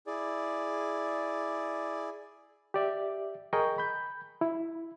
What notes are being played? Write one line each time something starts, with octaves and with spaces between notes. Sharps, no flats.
E4 G#4 D5
G4 D5 E5
G#4 A#4 D#5 G5 C#6
B5 G6
E4